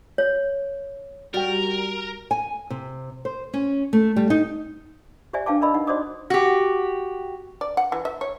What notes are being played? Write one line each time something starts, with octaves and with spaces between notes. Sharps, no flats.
C#5
G3 F#4 A#4 G5
G#5
C3
C5
C#4
A3
G3
D#4
G4 C5 D5 E5 G#5
D4 B4 F5 G5 A5 D6
A#4 D5 D#5 B5 E6
D#4 F#5
F#4 C5 D5 D#5 D6 D#6
F#4 G4
D5
F#5
E3
E5
C#5